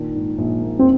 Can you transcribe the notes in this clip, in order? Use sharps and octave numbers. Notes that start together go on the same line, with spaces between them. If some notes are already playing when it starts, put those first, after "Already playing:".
Already playing: A#2 D#3 D4
G#2
A#1
A#3
C4